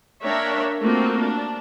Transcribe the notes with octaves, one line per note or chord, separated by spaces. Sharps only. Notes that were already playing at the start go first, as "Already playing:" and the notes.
A#3 D4 A#4 C#5 E5 G5
A3 A#3 C4 F4 F#4
D4